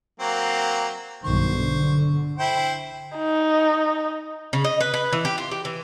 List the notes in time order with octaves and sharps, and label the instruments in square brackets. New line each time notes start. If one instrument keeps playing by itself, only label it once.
[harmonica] F#3 A#3 C4
[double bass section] B1 G2 D#3 [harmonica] C5 C#6
[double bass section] D3
[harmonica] E4 C5 G5
[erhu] D#4
[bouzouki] C#3
D#5
B4
B4
E3
G4
F4
G4
E3